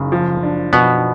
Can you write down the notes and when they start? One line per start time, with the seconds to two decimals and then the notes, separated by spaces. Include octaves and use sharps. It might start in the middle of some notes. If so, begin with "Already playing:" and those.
Already playing: F#1 C#3
0.12 F3
0.43 D4
0.73 B2 F3 B3